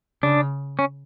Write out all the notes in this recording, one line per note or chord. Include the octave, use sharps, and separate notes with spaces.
C#3 D4
C#4